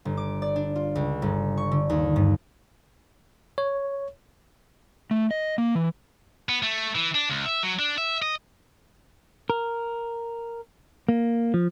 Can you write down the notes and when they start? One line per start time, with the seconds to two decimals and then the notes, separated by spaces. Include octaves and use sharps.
0.05 G1
0.17 D6
0.42 D5
0.56 D4
0.76 F4
0.95 C#2
1.22 G1
1.57 C#6
1.72 D3
1.90 D#2
2.16 G2
3.58 C#5
5.11 A3
5.31 D#5
5.58 A#3
5.75 E3
6.49 B3
6.63 A3
6.95 E3
7.15 D4
7.29 C#2
7.46 E5
7.63 F#3
7.79 D4
7.98 E5
8.22 D#5
9.50 A#4
11.09 A#3
11.54 F3